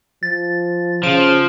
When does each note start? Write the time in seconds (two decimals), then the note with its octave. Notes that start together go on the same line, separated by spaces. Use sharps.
0.23 F3 A6
1.03 C#3 F3 D7